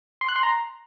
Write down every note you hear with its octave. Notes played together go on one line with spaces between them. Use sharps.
C6
F#6
C6
A#5